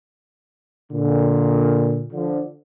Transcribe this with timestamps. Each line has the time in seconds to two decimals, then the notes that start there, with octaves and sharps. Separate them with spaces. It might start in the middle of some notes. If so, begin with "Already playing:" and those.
0.92 A#2 D3
2.13 D3 F3